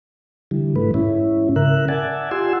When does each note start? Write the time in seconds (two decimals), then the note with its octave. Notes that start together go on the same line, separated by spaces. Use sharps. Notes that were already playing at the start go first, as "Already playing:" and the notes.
0.51 D3 E3 G3
0.76 G#2 E3 A3 B4
0.94 G#2 C#4 E4
1.56 C#3 A#4 E5 F#6
1.88 D5 E5 F#5 G#5 A5
2.31 F4 G4 F#5 G#5 C6 E6